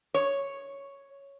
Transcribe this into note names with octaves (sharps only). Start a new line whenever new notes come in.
C#5